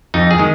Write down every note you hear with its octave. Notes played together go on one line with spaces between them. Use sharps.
F2 D#4
G#4
D#3 G#3